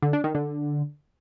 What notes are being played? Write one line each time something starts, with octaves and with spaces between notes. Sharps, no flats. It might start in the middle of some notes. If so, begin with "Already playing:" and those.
D3
D4
D#3
D3